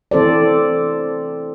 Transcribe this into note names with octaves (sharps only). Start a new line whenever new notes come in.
E3 C4 A4 C5 D5